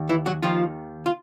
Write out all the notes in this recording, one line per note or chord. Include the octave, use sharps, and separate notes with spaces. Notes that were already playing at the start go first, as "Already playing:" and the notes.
Already playing: D#2
E3 E4
F#3 F#4
D#2 D#3 F3 F4
F4